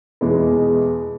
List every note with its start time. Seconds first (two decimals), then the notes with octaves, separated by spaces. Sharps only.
0.21 E2 B2 G#3 B3